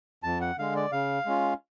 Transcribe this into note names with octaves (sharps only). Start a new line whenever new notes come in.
F2 A5
F#5
D3 G#3 F5
D5
C#3 F5
G#3 C#4 F4